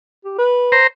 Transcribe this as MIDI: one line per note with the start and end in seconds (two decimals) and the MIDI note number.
0.25 0.34 67
0.38 0.76 71
0.72 0.87 72
0.72 0.87 82